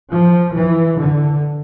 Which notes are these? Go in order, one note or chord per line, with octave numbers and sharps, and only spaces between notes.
F3
E3
D3